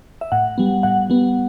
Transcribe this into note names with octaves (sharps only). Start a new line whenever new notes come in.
E5
A2 F#5
G3 B3
A2 F#5
G3 B3